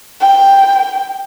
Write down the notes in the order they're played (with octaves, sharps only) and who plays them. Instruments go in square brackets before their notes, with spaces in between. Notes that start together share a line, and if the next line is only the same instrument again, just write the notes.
[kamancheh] G5